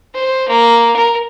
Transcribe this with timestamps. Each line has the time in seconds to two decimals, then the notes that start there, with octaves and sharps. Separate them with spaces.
0.14 C5
0.48 A#3
0.96 A#4